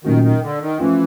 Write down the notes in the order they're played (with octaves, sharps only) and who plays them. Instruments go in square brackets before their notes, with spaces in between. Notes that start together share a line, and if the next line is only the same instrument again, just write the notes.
[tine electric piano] A#2 F#3 A3 C#4 F#4 [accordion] D#3
[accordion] D#3
D3
D#3
[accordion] E3 [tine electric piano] F3 A3 C#4 F4